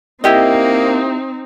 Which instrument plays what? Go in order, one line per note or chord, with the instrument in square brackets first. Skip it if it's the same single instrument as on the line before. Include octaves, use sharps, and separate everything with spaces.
[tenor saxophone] A#3 [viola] C4 D#4 [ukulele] E4 G4 D#5